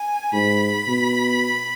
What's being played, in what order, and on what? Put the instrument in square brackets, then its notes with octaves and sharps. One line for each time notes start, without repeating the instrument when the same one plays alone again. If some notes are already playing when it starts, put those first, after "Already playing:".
Already playing: [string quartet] G#5
[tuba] G#2 [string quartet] B5
[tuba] B2